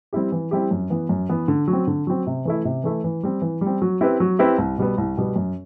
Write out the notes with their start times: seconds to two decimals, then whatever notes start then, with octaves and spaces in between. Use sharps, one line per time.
0.13 G3 C4 E4 G4
0.32 E3
0.51 G3 C4 E4 G4
0.71 F#2
0.90 E3 B3
1.09 F#2
1.29 E3 B3
1.48 D3
1.68 F#3
1.73 C4
1.87 D3
2.07 F#3 C4
2.27 C3
2.45 E3 A3 E4
2.65 C3
2.84 E3 A3 E4
3.04 E3
3.23 G3 C4
3.42 E3
3.61 G3
3.67 C4
3.82 F#3
4.01 C4 E4 G4 B4
4.20 F#3
4.39 C4 E4 G4 B4
4.58 C2
4.78 B2 G3 B3
4.98 C2
5.17 B2 G3 B3
5.36 F#2